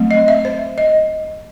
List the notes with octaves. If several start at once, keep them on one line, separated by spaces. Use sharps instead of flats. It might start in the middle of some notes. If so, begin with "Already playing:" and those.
Already playing: F#3 A3 C4
D#5
E5
C5
D#5